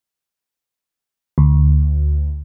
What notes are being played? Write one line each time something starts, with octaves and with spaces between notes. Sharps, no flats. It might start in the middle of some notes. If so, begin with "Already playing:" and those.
D2